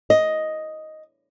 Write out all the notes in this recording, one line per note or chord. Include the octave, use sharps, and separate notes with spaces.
D#5